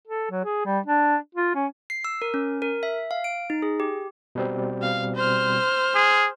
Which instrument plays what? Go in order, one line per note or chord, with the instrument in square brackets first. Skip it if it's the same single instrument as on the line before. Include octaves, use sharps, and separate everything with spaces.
[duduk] A4
F#3
G#4
G3
D4
F4
C#4
[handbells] C7
E6
A#4
C#4
A#4
E5
F5
D7
D#4
G#4
G4
[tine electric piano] B2 G3 C4
[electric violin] F5
C5 F6
[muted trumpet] G#4